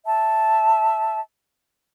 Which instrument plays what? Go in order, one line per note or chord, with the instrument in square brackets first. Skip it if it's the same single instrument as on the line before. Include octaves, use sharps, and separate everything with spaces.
[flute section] E5 A5